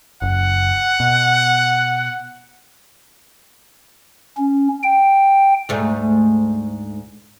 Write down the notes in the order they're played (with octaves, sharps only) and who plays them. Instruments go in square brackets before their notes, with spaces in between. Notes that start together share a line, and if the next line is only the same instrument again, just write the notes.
[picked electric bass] F#1 [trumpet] F#5
[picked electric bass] B2
[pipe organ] C#4
G5
[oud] D2 G#2 A3